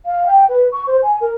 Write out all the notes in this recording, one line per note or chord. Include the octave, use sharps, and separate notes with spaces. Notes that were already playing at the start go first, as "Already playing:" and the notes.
F5
G5
B4
C#6
C5
G#5
A#4